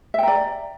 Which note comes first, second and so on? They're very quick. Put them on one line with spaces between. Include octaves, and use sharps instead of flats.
E5 G5 A#5 D5